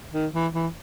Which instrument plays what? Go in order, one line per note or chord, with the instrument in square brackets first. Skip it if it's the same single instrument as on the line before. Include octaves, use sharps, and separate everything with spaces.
[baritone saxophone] D#3
E3
E3